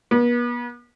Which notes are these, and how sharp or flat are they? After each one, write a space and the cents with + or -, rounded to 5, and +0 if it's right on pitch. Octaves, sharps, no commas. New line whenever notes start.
B3 -40